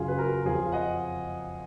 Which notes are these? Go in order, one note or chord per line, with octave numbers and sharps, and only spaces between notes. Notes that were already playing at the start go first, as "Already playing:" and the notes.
Already playing: F#2 C#3 F#3 F4 G#4
B4
F#4 A#4
F2 F3 F4 G#4
F5
D#5 F#5